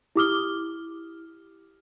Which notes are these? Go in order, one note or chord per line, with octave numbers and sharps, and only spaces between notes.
E4 G4 D6 D#6 F6 G7